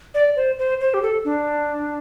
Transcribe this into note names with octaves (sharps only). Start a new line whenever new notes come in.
D5
C5
C5
C5
G4
A4
D4